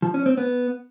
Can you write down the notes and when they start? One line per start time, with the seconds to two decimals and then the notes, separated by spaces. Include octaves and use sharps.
0.02 F3
0.14 C#4
0.26 C4
0.37 B3